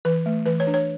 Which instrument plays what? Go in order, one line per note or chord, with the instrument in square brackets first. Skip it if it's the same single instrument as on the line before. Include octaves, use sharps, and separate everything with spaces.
[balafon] E3 B4
A3
E3 B4
C#5
D4
C#5